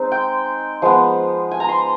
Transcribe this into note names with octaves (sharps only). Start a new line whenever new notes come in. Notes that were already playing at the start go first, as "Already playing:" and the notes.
Already playing: G#3 C4 D#4
G5
F3 G#3 B3
G#5
A#5
C6